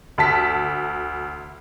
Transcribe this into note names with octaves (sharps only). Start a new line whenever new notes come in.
D2 A5 B6